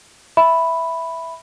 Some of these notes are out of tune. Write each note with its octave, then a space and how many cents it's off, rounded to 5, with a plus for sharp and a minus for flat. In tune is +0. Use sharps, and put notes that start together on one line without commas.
E5 +0 B5 +0